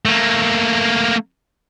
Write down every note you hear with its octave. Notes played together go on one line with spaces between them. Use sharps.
A3 A#3